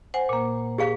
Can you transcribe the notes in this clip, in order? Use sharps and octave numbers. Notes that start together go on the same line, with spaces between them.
C5 F#5 G#5
A#2 A#3
G4 G#4 F5